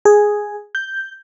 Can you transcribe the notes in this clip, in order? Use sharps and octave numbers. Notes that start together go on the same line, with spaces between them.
G#4
G6